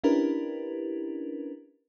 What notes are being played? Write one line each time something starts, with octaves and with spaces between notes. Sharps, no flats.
C#4 D4 E4 G4 A#4 B4